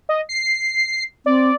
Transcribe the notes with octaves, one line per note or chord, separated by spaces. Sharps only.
D#5
C7
C4 D5